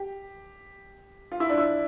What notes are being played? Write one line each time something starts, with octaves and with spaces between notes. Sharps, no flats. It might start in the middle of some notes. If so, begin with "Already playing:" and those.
Already playing: G4
F4
E4
D4
E4